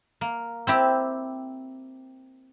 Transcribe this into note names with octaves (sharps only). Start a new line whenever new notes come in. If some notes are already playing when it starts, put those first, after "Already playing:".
A#3
C4 E4 G4